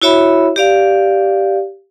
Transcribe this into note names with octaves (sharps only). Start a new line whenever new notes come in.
E4 F#4 C#5 E5 B5
G4 D5 F5